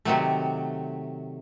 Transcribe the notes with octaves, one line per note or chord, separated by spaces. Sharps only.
C3 D#3 F#3 A3